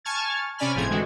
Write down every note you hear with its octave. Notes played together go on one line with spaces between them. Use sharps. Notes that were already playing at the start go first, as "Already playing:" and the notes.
G#5 A5 C#6 F6 G#6 A6
C3 C#4 D5 G#5 B5 F6
G1 A2 F3 C4 G#4 G#6
D3 E3 G#3 F#4